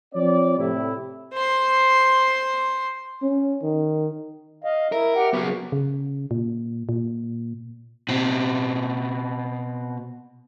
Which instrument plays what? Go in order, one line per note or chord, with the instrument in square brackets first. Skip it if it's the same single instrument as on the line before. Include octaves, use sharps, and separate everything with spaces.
[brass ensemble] F3 C4 C#5 D5
A2 C3 E4
[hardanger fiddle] C5 C6
[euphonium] C#4
D#3
[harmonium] D#5 F5
[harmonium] E4 E5 [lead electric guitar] A#4
[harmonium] G4 F#5 G5
[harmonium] C#3 [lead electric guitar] F#3 B3
[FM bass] C#3
A#2
A#2
[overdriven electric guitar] B2 C4